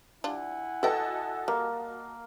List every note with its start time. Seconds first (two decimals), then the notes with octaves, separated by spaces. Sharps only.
0.24 G3 D4 E4 F4 F#5 G#5
0.83 F#4 A4 B4 D#5 G5 A5
1.48 G3 A#3